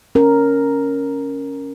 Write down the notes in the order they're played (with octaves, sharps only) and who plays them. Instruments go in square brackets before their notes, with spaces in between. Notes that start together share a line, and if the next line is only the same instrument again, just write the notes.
[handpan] C#4 A#4